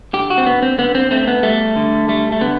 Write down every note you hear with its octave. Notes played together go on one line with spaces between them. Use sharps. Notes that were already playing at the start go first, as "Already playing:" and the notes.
D3 G4
F#4
C4
D3 B3
C4
D3 B3
C4
A3 C4
B3
G3 A3
D3
G3 A3
A3
D3 B3